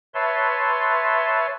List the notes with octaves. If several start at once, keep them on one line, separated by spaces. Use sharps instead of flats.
B4 C#5 E5 A5 C6